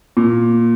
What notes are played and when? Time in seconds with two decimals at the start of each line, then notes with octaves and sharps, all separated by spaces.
0.17 A#2